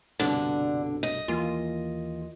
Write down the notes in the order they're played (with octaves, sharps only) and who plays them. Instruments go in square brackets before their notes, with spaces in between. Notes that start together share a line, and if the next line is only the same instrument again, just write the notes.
[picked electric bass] C2 G2 B2 [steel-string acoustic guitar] D3 [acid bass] D4
[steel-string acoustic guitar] D#5
[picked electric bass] D#2 E3 A#3 [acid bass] F4